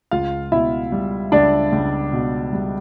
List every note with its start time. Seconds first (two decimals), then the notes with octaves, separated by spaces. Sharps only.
0.11 C#2 F4 F5
0.52 B2 E4 E5
0.92 G3
1.32 C#2 D4 D5
1.72 C#2
2.13 B2
2.53 G3